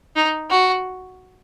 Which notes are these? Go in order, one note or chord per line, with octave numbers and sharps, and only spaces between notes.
D#4
F#4